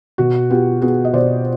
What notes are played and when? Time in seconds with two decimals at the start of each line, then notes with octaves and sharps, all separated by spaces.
0.18 B2 F#4
0.50 B3 F4 G4
0.81 B3 F#4 G#4
1.05 D#5
1.13 B2 C5 D5